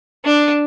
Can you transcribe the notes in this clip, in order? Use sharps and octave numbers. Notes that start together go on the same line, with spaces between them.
D4